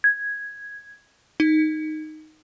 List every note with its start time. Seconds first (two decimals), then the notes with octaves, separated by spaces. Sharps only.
0.04 G#6
1.40 D#4